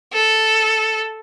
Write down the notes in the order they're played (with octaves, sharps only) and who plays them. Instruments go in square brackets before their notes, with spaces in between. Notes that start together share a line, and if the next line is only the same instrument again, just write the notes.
[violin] A4